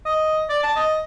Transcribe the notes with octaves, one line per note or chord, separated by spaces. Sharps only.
D#5
D5
A5
D#5